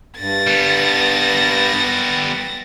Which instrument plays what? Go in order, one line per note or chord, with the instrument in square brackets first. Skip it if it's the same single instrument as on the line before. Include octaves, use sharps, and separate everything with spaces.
[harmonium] G2 [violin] A6 A#6
[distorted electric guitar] G3 B3